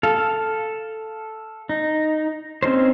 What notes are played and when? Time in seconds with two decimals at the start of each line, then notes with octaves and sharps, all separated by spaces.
0.03 A4 F5
1.69 D#4
2.63 C4 C#4 D#4 C5